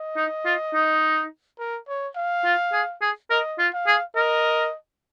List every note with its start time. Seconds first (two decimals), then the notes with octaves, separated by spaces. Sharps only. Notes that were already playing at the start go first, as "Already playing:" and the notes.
Already playing: D#5
0.17 D#4
0.45 F4
0.74 D#4
1.59 A#4
1.88 C#5
2.16 F5
2.45 F4
2.73 G#4
3.02 G#4
3.30 A#4 D#5
3.59 F4
3.73 F5
3.87 G#4
4.16 A#4 D#5